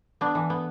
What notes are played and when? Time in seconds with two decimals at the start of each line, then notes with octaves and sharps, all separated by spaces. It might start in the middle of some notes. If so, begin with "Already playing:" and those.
0.21 B3 D4
0.35 E3
0.50 B3